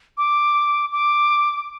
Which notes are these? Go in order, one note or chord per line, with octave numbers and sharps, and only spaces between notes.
D6
D6